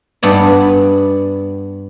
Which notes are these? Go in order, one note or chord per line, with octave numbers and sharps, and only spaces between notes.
G2 B3 D5